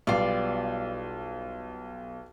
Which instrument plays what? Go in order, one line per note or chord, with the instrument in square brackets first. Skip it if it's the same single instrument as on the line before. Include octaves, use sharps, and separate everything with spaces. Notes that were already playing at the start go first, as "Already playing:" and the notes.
[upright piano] B1 [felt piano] G3 B3 [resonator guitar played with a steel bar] F4 D5